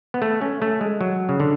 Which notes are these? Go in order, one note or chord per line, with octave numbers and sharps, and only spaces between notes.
B3
A3
C#4
A3
G#3
F#3
C#3
D3